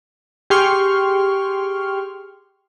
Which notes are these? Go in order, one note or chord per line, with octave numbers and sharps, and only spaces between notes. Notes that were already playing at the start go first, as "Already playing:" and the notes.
G4 G#4 G5 C6 C#6 F6